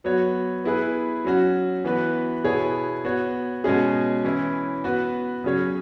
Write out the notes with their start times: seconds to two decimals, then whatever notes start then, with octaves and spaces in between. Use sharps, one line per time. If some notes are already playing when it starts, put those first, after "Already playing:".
0.04 F#3 B3 F#4 C#5
0.64 B3 E4 G#4 B4
1.24 F#3 C#4 F#4
1.84 E3 B3 F#4 B4
2.44 B2 B3 E4 G#4 C#5
3.05 B3 F#4 C#5
3.64 B2 G#3 C#4 G#4
4.25 E3 C#4 E4
4.84 B3 F#4 B4
5.44 C#3 F#3 C#4 G#4 C#5